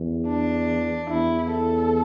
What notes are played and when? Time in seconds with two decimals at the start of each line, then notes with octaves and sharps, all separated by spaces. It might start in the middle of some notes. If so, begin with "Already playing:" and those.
Already playing: E2
0.27 D4
1.10 E2 E4
1.51 A4